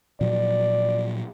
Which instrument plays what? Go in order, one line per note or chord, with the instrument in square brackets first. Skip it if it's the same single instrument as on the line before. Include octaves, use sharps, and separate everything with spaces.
[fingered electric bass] A#2 F3 F#3 [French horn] D5